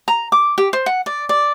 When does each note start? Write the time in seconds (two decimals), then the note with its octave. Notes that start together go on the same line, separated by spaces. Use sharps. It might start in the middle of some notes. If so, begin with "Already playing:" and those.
0.08 A#5
0.32 D6
0.58 G4
0.73 C5
0.86 F#5
1.06 D5
1.29 D5